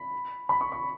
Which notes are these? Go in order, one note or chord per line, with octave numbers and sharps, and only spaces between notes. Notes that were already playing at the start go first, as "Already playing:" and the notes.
Already playing: B5
B5
C#6
C#6